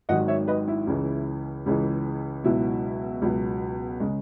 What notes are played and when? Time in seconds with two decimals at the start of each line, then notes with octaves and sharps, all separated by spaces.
0.09 G#1 G#2 D#3 F#3 D#5 F#5
0.28 C#5 E5
0.48 B4 D#5
0.68 E4
0.87 C#2 C#3 E3 G#3
1.66 C#2 C#3 E3 G#3
2.44 C#2 B2 F#3 E4
3.22 C#2 B2 F#3
4.00 C#3 G#3